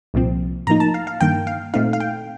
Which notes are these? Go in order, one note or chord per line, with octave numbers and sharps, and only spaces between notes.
C2 A#2 F3 C4
A2 F3 A#3 D#4 A#5
A5
F5
F5
G2 D#3 A#3 G5
F5
A#2 A3 C4 D#4 F5
F5
G5